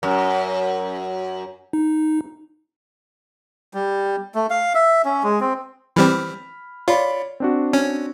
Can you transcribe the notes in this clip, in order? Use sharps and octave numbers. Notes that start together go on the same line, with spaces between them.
F#2
D#4
G3
A3
F5
E5
C#4
G#3
C4
E3 G3 C4 B5 F6
F4 C#5 D5 B5
C4 D4 F#4
C#4